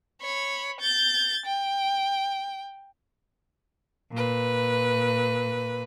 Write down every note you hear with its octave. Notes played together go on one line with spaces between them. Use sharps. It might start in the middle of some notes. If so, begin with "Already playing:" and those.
C#5 B5
G6 A6
G5
A#2 B4